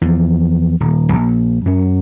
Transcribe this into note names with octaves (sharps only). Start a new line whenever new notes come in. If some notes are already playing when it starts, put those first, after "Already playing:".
E2 F3
D#1
A#1
F#2 C#4